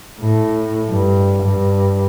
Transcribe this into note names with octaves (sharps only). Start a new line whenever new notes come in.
A2
G2
G2